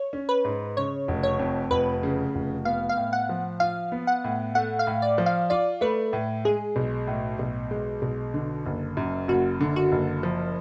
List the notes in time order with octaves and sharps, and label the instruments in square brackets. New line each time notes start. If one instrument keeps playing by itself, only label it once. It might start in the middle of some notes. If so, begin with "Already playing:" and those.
Already playing: [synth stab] C#5
[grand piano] C#4
[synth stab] B4
[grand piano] G#2
[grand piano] C#3 [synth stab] C#5
[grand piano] F1
[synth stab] C#5
[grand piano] F2
[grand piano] F1 [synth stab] B4
[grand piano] C#3
F1
[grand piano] B3 [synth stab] F5
[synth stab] F5
[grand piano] A2
[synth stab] F#5
[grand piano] F3
[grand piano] F4 [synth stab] F5
[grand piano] B3
[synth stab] F#5
[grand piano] A2
[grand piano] A3 [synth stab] F#5
[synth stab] F5
[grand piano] A2
[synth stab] D5
[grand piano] F3
[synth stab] F5
[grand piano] F4 [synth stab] D5
[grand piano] A3 [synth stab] B4
[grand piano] A2
[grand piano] G#3 [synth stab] G#4
[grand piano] B1
A2
B1
G#3
B1
D3
F#1
F#2
[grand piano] F#1 [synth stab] F#4
[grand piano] D3
[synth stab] F#4
[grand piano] F#1
F3